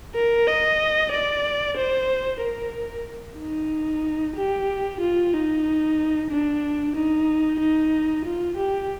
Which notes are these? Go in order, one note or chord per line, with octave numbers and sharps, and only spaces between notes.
A#4
D#5
D5
C5
A#4
D#4
G4
F4
D#4
D4
D#4
D#4
F4
G4